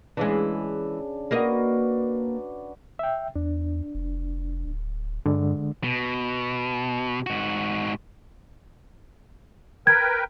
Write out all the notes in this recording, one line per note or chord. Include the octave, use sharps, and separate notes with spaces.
C#3 E3 G#3 D4
A#3 F#4 A#4 B4 D5 D#5
E5 G5
E2 D4
F1
D1
G2 D3 G#3
B2
G#2 F#4
A#4 B4 G5 G#6